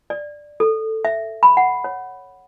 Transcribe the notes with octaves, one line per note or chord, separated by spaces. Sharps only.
D5
A4
E5
B5
F#5
C#5